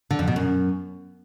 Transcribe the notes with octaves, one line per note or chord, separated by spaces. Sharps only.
D3
F2
B2
F#2